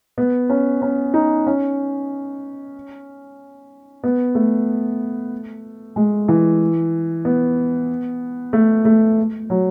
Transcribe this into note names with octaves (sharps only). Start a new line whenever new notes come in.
B3
C#4
C#4
D#4
C#4
B3
A3
G#3
E3
B3
A3
A3
F#3